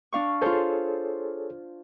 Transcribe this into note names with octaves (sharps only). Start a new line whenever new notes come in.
D4 F5 C#6
F4 G#4 A4 C5 C#5